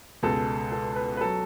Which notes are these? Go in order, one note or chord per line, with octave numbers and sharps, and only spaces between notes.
C#2 B2 G#3 A4
A4
B4
B4
F#3 A4